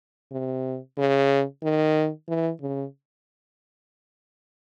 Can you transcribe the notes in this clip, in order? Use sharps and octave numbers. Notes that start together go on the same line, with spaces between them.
C3
C#3
D#3
E3
C#3